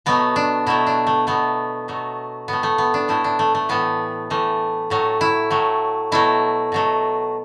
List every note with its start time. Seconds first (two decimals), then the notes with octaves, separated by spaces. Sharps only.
0.06 B2 F#3 A3 B3
0.36 D4
0.66 B2 F#3 A3 E4
0.87 D4
1.07 A3
1.27 B2 F#3 A3 B3
1.88 B2 F#3 A3
2.48 A2 A3 B3
2.63 A3
2.78 B3
2.94 D4
3.08 A2 A3 E4
3.24 D4
3.39 A3
3.55 A3
3.69 A2 E3 A3 B3
4.30 A2 E3 A3
4.90 A2 F#3 A3
5.21 E4
5.50 A2 F#3 A3
6.12 B2 F#3 A3 E4
6.72 B2 F#3 A3